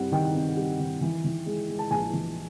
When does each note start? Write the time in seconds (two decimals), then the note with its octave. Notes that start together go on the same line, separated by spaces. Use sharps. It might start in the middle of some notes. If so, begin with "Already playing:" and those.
Already playing: G2 G3 C4 F#5
0.12 D#3 G5
0.34 C4
0.57 G3
0.79 D#3
1.01 E3
1.24 E3
1.46 G#3
1.69 G#3
1.79 A5
1.91 A#1 G#5
2.13 E3